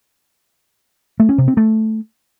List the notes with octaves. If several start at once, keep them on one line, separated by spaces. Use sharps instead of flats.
A3
C#4
C3
C4
A3